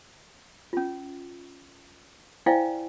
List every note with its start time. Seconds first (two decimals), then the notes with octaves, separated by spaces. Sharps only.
0.73 C#4 F4
2.46 E4 C5 D5 F5 G5 G#5